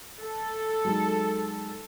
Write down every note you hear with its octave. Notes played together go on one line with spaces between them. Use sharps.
A4
F#3 G#3 D#4